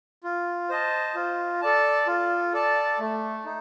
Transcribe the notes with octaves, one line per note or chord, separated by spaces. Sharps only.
F4
C5 D#5 A5
F4
A4 D5 A5
F4
A4 D5 A5
A3
D#4